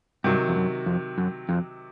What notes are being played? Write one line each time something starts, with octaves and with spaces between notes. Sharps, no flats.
G2 C3 D#3 F#3
F2
F#2
F2
F#2
F2